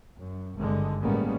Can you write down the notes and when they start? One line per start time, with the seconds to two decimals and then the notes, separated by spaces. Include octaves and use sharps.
0.18 F#2
0.56 G#1 G2 D3 G#3
1.02 A1 G3 G#3 A#3 B3 C#4